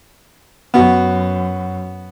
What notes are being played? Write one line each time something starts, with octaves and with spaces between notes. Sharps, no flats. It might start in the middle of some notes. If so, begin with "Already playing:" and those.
F#2 B3 F#4